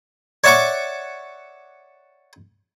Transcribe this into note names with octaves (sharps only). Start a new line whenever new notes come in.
C#5 D5 E5 F#5 C#6 D6